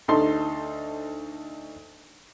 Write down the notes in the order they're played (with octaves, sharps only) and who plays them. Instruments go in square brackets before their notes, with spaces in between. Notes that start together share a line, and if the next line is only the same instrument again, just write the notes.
[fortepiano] D2 D#4 A4 C6